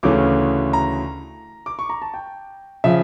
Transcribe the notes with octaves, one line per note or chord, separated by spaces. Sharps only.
D2 C#3 E3 A3 C#4 D6
A#5
D6
C#6
A#5
A5
G5
C#3 F3 E5